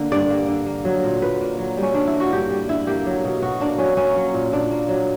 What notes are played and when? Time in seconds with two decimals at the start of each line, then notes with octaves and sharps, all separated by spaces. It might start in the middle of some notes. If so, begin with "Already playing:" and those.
Already playing: D3 A#3
0.12 G2 D5
0.30 A#3
0.48 D3
0.66 A#3
0.85 F#3
1.04 A#2
1.22 A#2 B4
1.41 A#3
1.58 F#3
1.77 G3
1.82 C#4
1.94 D3 D4
2.07 E4
2.13 A#3
2.20 F#4
2.32 G2 G4
2.51 G3
2.69 D3 E4
2.87 A#3 G4
3.06 F#3
3.24 B2
3.42 B2 F#4
3.60 A#3 D4
3.78 F#3 C#4
3.97 A#3 C#4
4.16 F#3
4.34 A#2
4.52 A#2 D4
4.71 A#3
4.88 F#3